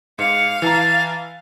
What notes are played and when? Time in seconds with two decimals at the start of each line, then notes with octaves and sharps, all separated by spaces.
0.19 G#2 F5 C#7
0.62 E3 A5 A#5 A6